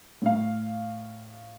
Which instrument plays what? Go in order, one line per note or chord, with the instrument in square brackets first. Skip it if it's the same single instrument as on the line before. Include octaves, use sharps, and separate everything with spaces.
[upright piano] A2 F5